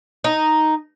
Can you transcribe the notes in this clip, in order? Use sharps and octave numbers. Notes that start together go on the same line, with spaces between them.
D#4